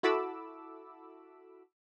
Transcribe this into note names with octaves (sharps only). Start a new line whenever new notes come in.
E4 F#4 A4 B5 D6 E6